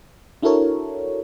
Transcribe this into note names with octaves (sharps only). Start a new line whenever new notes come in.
D4 E4 F#4 A4 A#4 C#5